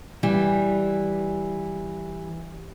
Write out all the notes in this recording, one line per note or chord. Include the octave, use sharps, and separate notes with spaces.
E3 G3